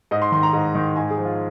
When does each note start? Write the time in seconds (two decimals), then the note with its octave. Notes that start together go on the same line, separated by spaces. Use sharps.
0.11 G#2 D#5
0.22 C6
0.32 D#3 C6
0.43 A#5
0.53 G#2
0.75 D#3
0.96 G#2 G#5
1.10 G#4
1.18 F3
1.25 F4